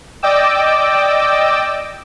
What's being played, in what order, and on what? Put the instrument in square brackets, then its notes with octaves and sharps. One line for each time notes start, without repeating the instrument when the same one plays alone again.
[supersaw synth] D5 D#5 G5 D6 E6